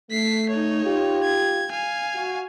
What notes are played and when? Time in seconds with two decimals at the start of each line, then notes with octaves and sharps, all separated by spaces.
0.11 A3 B6 C7
0.49 D#4 C#5
0.85 F4 G4
1.23 G#6
1.71 F5 G#5
2.15 F#4